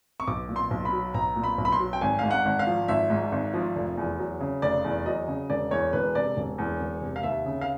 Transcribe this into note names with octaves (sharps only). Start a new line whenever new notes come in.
C#6
B1 D6
A#2
C6
B1
B5
F#3
B1 A#5
A#2
B5
B1
B5
C6
F#3
G5
G#1 G#5
G#2 F5
F#5
G#1
F5
F3
G#1 E5
G#2
G#1
F3
F1
E2
F#3
C#3
F1 D5
E2
F#3 D#5
C#3
E1 D5
E2 C#5
E1 B4
C3 D5
E1
E2
E1
C3
F5
D#2 E5
C#3
F5